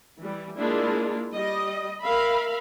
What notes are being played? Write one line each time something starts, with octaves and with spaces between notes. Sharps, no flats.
E3 G3
G#3 A#3 D4 E4 F4
G3 D#5
A#4 E5 F5 B5